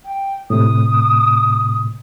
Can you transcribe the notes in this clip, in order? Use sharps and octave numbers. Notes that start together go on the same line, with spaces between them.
G5
A2 C3 D#6